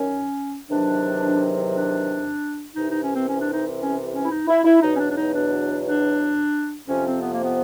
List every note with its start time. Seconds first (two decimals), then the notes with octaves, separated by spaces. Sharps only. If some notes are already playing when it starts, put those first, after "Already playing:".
Already playing: F#2 D#3 F#3 C#4
0.70 E2 C3 D#3 F#3 D4
1.73 D4
2.75 C2 C3 E3 D#4
2.88 D#4
3.02 C#4
3.15 C4
3.27 C#4
3.40 D4
3.53 D#4
3.79 C#4
4.13 C#4
4.25 E4
4.30 D#4
4.47 E4
4.64 E4
4.81 E2 B2 F#3 D#4
4.93 C#4
4.98 D4
5.09 D4
5.16 D#4
5.33 D4
5.84 D4
6.87 F2 C3 F3 C#4
7.04 C4
7.21 B3
7.32 A#3
7.42 B3